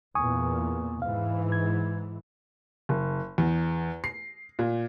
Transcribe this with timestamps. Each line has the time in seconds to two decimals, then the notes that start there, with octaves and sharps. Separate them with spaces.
0.15 E2 A#2 G#5 C#6 D#6
1.02 G#2 E3 F5
1.52 G#6
2.89 F#1
3.38 E2
4.04 C7
4.59 A#2